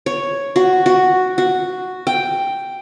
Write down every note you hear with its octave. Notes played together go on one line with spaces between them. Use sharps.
C#5
F#4
F#4
F#4
G5